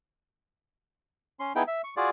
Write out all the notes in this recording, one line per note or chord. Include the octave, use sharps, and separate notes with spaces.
C#4 C6
B3 D#4 E4 G#4 G5
E5
C#6
F4 F#4 G#4 D5